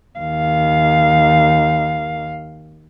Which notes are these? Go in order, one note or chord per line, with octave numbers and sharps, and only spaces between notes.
D#2 F5